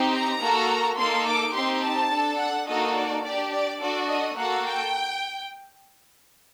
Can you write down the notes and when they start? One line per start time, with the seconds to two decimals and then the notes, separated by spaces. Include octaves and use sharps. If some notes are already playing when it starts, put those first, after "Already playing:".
Already playing: C4 D#4 G4
0.13 A#5
0.41 A#3 F#4 A4
0.98 A#3 D#4 A4 C6
1.26 D6
1.55 C4 D#4 G4 C6
1.82 A5
2.11 D4 A4
2.39 F#5
2.68 A#3 D#4 F#4 A4 D#5
2.96 D5
3.24 D4 G4 D5
3.52 D5
3.80 D4 F#4 A4 D5
4.09 D#5
4.37 A#3 F#4 A4 F#5
4.65 G5